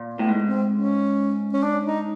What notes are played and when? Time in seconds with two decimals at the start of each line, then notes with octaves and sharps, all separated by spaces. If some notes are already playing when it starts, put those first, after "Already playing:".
Already playing: A#2
0.14 B3
0.19 A2
0.29 G#2
0.44 C4
0.74 C#4
1.53 C#4
1.63 D4
1.85 D#4